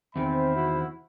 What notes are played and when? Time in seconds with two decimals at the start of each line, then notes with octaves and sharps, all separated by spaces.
0.16 E2 D#3 C4 C5 E5 B5
0.54 C3 E4 F#4